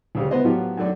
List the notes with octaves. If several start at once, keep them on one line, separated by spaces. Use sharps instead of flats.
D2 C#3 G4
B3 B4 C5 D#5
A2 F3 F#3 B3 F4 G4
F#2 D#3 A3 D4 A4